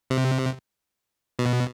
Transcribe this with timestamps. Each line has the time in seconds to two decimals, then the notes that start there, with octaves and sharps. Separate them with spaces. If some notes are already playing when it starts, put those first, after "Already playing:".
0.10 C3
1.39 B2